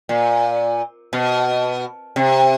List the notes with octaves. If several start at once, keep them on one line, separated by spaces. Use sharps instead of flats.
A#2
B2
C3